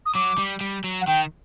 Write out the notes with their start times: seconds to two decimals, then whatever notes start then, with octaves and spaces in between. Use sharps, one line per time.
0.06 D#6
0.15 F#3 D6
0.38 G3
0.61 G3
0.84 F#3
1.01 F#5
1.07 D#3 G5